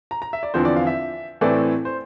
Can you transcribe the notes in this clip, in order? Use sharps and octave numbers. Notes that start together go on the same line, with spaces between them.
A#5
A#5
E5
D5
E2 D3 F3 C4 C5
D5
F5
E5
A2 E3 A3 C4 D5
C5